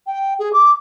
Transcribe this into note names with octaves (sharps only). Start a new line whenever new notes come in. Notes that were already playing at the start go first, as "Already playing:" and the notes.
G5
G#4
D6